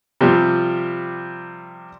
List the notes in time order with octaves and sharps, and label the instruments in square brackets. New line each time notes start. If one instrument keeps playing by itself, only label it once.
[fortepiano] C3 F3 G3